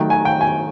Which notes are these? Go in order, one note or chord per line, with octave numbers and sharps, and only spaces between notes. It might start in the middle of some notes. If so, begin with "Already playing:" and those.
Already playing: D#3 F#3 A3 G5
G#5
G5
G#5